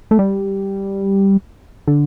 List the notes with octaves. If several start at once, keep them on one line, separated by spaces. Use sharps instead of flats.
A3
G3
D3